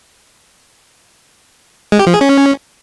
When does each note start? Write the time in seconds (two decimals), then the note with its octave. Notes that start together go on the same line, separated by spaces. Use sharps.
1.92 G#3
1.99 G4
2.07 F3
2.14 G#4
2.21 C#4